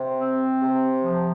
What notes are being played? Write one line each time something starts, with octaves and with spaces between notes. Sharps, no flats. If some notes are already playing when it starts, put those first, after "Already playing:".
Already playing: C3
C4
C3
F3